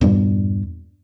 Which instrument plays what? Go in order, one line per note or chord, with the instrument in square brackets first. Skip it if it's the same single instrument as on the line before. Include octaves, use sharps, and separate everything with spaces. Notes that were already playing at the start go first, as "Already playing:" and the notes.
[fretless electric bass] E2 G2 A#2 G3